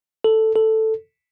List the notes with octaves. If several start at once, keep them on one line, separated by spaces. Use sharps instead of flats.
A4
A4